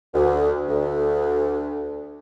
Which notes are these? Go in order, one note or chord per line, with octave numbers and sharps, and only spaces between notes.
D2
D2